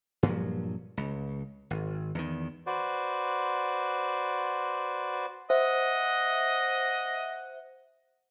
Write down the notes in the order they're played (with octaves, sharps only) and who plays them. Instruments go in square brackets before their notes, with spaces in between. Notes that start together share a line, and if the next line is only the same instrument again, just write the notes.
[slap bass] G2 A#2 F3 F#3
C#2
G#1
E2 D#3
[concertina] F#4 B4 C5 D5
[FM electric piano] C5 E5 [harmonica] D#5 [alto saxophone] F#5